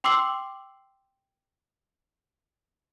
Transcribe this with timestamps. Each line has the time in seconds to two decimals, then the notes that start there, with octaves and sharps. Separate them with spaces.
0.04 G5 C6 D6 E6 C7 F#7